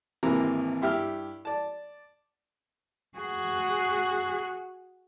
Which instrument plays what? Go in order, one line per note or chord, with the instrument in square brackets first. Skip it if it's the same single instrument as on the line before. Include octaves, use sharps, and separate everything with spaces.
[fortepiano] G#1 C3 E3 A#3 A#5
G2 E4 G4 E5 G5 F6
D5 A5
[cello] F#4 G#4